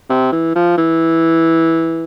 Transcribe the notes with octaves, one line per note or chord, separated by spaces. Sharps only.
C3
E3
F3
E3